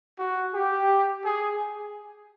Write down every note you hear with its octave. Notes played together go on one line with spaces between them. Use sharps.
F#4
G4
G#4